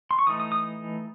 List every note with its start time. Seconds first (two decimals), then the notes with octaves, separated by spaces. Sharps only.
0.11 C6
0.19 C#6
0.27 E3 A3 D#4 D#6
0.40 D#6
0.52 D#6